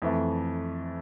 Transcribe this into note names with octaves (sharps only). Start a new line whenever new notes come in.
F2 E3 A3